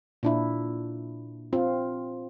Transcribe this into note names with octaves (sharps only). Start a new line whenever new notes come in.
A#2 D4 E4
C4 F4